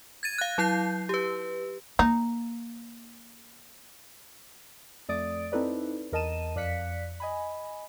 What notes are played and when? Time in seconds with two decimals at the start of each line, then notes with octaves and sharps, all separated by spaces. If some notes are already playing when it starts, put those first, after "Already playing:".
0.23 G#6 A6 D#7
0.38 F5 F#6
0.58 F#3 E4 G6 C7
1.09 G4 B4
1.99 A#3 D#4
5.09 F2 A3 D5 D#6 A6 D7
5.52 C4 D#4 E4 A4 B4 D5
6.12 E2 A#4 D#5 A5 D#7 E7
6.56 F2 D5 F5 F#6 B6 C#7
7.20 D#5 G#5 B5